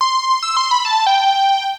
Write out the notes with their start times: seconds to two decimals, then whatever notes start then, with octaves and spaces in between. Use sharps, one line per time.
0.01 C6
0.43 E6
0.57 C6
0.71 B5
0.85 A5
1.07 G5